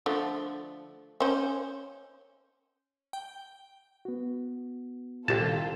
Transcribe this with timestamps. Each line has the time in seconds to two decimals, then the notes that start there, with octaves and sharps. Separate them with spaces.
0.06 D3 F3 A3
1.20 C#4 C5
3.13 G5
4.05 B3 F#4
5.28 C2 A#2 D#3 F4 G4 A4 A5